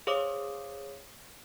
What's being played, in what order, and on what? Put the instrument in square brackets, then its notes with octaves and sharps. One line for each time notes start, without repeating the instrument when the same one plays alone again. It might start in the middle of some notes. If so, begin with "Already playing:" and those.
[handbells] G#4 C5 C#5 F5 D6 D#6